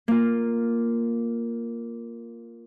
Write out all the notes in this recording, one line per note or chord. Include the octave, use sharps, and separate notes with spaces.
A#3 F4